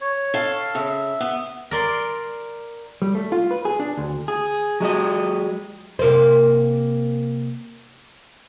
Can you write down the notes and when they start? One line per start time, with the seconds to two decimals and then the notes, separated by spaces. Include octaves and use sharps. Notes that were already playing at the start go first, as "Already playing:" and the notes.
0.01 C#5
0.34 A4 F5
0.75 C#3 E5
1.20 B3
1.71 A#4 D5 C6
3.02 G3
3.15 A3
3.32 F4
3.51 B4
3.65 G#4
3.80 D4
3.97 D2
4.28 G#4
4.80 F#3 G#3 G4 D#5
5.99 C3 A#3 C5